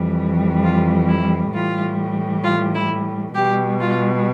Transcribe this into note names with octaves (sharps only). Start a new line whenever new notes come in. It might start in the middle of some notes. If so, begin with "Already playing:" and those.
Already playing: F2 E3 G3
F4
E4
A2 E3 G3 F4
F4
E4
B2 G3 G4
F4